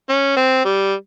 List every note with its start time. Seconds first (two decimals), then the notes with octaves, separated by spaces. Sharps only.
0.10 C#4
0.37 C4
0.65 G3